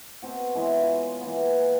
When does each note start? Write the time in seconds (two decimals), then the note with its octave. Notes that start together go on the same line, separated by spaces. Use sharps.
0.22 B2 C4 F#4
0.55 E3 G#3 E4 C#5
0.81 F4 G#5
1.21 E3 A#3 B3